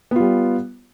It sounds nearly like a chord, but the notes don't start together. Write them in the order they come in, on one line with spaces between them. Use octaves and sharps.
B3 F4 G3